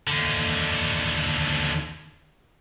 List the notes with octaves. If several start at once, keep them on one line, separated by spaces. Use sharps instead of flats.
D#2 D3